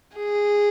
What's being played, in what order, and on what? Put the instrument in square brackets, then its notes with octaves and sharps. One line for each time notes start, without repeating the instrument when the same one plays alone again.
[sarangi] G#4